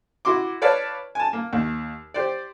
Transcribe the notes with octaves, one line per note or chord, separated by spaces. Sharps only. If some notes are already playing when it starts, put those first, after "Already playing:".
E4 F#4 C6 D6
B4 C#5 D5 F5 A5
G#5 A5
A#3
D#2
G4 C5 D5